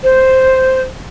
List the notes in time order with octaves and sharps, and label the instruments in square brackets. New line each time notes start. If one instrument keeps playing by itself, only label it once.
[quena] C5